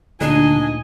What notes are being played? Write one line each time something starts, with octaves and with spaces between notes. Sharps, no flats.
D2 A#2 D3 D4 D#4 D#5 G#5